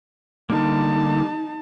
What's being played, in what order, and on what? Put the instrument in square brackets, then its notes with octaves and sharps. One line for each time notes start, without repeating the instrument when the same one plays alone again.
[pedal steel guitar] D3 G3 A#3 [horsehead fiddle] D#4 A5